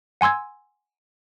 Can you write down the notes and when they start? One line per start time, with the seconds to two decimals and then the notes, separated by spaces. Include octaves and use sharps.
0.21 F#5 G#5 C6 E6 G#6